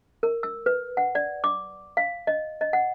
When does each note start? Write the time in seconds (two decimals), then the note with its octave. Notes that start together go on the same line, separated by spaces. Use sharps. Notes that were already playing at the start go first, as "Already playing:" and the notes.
0.23 A#4
0.43 E6
0.66 B4
0.97 F#5
1.15 D5
1.44 D6
1.97 F5
2.27 D#5
2.61 D#5
2.73 F#5